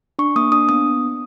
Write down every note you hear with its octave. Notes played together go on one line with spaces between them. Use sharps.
D4 C#6
A#3 D#6
D4 D#6
B3 D#6